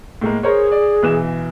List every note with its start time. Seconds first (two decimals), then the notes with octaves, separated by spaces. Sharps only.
0.21 A2 G#3 A#3
0.43 G#4 A#4 C5 C#5
0.72 D5
1.03 B1 E3 E7